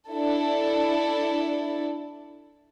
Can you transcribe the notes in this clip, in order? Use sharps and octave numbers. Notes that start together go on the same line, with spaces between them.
D4 E4 A4